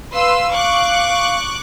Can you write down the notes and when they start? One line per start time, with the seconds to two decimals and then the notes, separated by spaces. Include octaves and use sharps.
0.14 B4 F5 C6 E6
0.52 C#6 D6 F#6